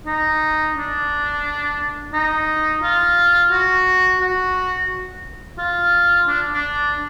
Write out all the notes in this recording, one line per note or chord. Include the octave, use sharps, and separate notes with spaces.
D#4
D4
D#4
F4
F#4
F#4
F4
D4
D4